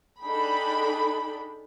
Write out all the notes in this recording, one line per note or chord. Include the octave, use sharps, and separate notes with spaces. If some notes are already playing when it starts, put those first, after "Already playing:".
D4 D#4 G#4 A4 G5 B5